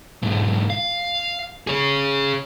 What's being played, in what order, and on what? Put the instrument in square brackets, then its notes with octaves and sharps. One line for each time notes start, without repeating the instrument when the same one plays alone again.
[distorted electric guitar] B1 G#2
F5
G#4 C#5